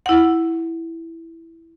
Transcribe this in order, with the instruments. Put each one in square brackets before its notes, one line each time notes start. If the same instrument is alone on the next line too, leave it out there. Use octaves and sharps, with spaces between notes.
[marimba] E4 F#5